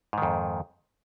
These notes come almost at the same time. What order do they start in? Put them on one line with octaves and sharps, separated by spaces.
G#2 D#3 F2